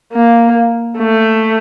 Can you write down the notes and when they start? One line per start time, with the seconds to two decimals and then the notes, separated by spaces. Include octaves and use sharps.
0.13 A#3
0.98 A3